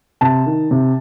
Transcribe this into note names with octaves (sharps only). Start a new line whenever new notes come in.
C3 A5
D#3
C3